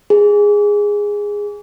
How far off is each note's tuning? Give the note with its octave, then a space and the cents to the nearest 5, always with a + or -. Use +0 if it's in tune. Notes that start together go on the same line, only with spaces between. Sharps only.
G#4 -10